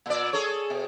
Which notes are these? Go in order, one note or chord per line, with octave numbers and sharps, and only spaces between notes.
A#2 D5
G#4 A4 C#5
B2